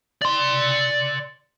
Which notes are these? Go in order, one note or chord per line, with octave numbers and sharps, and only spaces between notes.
D5 C6